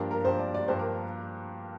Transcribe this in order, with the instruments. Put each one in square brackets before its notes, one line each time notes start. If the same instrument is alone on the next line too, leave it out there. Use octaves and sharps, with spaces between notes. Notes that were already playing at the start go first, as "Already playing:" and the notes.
Already playing: [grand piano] G2 F3 A#3 D4 G4 [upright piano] A#4
[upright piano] A#4
[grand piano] G2 F3 A#3 D4 G4 [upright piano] C5
[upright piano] D5
D5
[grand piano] G2 F3 A#3 D4 G4 [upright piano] C5
[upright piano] A#4